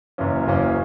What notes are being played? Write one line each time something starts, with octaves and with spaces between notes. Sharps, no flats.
F#1 F#2 E3 A#3 C#4
F#1 F#2 E3 A#3 C#4